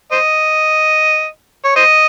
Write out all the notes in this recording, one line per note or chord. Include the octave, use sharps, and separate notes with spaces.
C5 D#5
C#5
C5 D#5